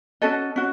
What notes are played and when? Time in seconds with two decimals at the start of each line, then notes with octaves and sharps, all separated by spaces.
0.22 C#4 F#4 A4 D#5
0.56 C#4 F#4